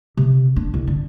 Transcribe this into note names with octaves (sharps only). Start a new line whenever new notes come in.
C3
D4
C2
D3